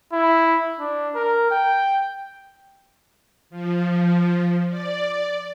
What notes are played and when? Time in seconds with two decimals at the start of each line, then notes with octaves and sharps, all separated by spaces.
0.13 E4
0.80 D4
1.15 A#4
1.51 G5
3.50 F3
4.70 D5